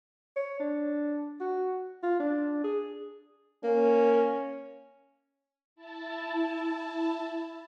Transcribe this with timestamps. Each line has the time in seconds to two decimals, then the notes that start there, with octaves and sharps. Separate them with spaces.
0.36 C#5
0.59 D4
1.40 F#4
2.03 F4
2.20 D4
2.64 G#4
3.64 A#3 C#4
5.76 E4 A5